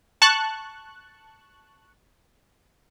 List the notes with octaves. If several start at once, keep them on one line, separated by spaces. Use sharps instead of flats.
A5 C#6 F#6